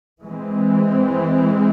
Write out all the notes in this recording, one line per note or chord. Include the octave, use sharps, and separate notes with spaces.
E3 G#3 C4